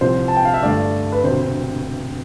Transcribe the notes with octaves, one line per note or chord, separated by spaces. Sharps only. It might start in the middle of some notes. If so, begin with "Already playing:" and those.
C2 C3 F3 C5
A5
G5
F5
E5
G2 D3 A3 D5
B4
E1 D2 C3 C5